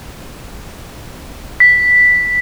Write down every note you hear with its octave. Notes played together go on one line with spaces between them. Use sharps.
B6